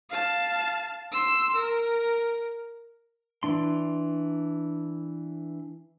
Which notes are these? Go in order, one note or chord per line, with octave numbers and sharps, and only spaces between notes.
F5 A5
C6 E6
A#4
E3 D4 C6